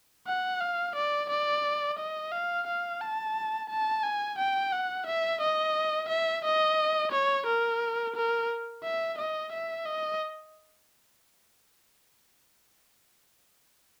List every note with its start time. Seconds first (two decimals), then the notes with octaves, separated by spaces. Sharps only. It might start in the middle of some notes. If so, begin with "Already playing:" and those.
0.27 F#5
0.61 F5
0.95 D5
1.30 D5
1.99 D#5
2.32 F5
2.67 F5
3.01 A5
3.69 A5
4.03 G#5
4.38 G5
4.72 F#5
5.07 E5
5.41 D#5
6.09 E5
6.44 D#5
7.12 C#5
7.46 A#4
8.16 A#4
8.84 E5
9.18 D#5
9.52 E5
9.86 D#5